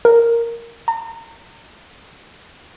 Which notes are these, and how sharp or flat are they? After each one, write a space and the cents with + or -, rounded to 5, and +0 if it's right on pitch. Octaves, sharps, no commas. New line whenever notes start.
A#4 -5
A#5 -35